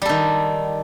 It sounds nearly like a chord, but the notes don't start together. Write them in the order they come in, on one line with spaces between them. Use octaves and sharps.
G3 A4 D#3